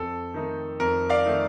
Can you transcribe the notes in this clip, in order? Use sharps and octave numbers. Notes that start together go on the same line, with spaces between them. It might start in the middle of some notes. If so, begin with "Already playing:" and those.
Already playing: F2 A4
D#3 A3 D#4
F2 A#4
D5 F5
D#3 A3 D#4